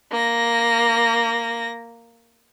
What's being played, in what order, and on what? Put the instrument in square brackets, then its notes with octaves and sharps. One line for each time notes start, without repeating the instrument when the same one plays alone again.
[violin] A#3 A#6